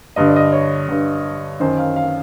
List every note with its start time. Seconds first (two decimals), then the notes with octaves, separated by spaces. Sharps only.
0.16 G2 D3 D#5
0.27 D5
0.36 D#5
0.52 C#5
0.88 G2 D3
1.60 F#2 D#3 C5
1.78 F5
1.96 F5